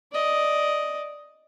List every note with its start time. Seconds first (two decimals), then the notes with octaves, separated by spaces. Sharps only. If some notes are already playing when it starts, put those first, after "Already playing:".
0.12 D5 D#5